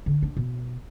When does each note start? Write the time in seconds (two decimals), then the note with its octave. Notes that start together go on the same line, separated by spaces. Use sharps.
0.06 D3
0.22 D4
0.37 B2